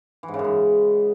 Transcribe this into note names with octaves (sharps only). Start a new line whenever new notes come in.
E3
G#2
C#3
F#2
G#2